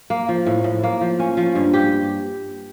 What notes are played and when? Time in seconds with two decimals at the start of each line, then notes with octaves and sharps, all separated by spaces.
0.10 A#3
0.29 F3
0.46 A2
0.64 A2
0.83 A#3
1.01 F3
1.20 C#4
1.37 F3
1.55 G2
1.74 G4